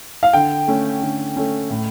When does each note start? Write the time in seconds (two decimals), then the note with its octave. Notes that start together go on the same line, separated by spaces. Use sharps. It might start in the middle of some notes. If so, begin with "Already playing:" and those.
0.23 F5
0.33 D3 G5
0.68 A3 C#4
1.01 D3
1.36 A3 C#4
1.70 A2